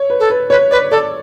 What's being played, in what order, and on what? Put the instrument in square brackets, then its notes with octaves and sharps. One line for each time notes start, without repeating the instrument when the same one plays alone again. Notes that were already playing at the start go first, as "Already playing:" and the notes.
Already playing: [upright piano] C#5
B4
[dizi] A4
[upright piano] B4
[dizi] B4 [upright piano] C#5
[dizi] B4 [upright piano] D5
[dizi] A4 [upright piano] D5